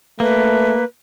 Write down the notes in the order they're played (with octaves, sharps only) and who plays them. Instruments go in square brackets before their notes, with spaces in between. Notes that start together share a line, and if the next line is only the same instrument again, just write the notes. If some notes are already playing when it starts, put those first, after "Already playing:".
[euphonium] A3 [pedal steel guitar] A#3 [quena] B4